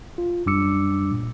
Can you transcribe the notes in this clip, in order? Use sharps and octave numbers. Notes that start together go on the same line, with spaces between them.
F4
F#2 G3 D4 D6 E6 C#7
A#2